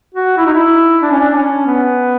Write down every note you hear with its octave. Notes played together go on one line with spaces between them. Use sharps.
F#4
E4
D#4
E4
D4
C#4
D4
C#4
B3